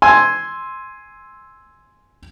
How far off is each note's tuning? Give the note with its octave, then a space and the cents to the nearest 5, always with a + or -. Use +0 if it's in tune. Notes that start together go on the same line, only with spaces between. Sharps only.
G#5 +0 C6 +0 E6 +0